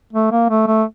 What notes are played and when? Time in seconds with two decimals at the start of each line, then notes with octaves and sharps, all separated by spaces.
0.13 A3
0.31 A#3
0.49 A3
0.67 A3